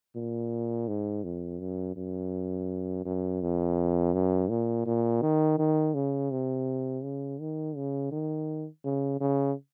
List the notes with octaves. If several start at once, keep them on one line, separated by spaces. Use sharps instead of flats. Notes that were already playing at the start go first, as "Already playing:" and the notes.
A#2
G#2
F2
F#2
F#2
F#2
F2
F#2
A#2
A#2
D#3
D#3
C#3
C3
C#3
D#3
C#3
D#3
C#3
C#3